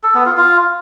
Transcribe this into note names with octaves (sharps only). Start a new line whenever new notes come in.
A4
B3
F4
F4